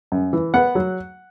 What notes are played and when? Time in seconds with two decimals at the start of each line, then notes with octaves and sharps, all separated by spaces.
0.12 F#2
0.33 E3
0.54 B3 F#5
0.75 F#3